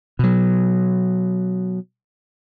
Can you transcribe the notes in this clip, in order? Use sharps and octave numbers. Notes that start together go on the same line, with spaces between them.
B2 F#3